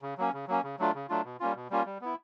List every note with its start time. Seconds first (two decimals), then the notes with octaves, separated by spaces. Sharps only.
0.02 C#3
0.18 F#3 A#3 C#4
0.33 C#3
0.48 F#3 A#3 C#4
0.63 C#3
0.79 F#3 A3 D4 F4
0.94 C#3
1.09 F#3 A3 D4 F4
1.24 B2
1.40 G3 A#3 C#4 F4
1.55 B2
1.70 G3 A#3 C#4 F4
1.86 G3
2.01 B3 E4